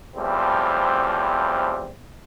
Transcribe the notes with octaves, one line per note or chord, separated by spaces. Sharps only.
E2 A2 F3 G3 C4